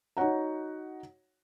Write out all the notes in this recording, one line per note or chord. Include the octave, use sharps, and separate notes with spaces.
D#4 F#4 C#5 F#5 A#5